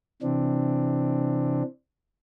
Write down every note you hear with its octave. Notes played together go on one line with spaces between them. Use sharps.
C3 E3 C4 D4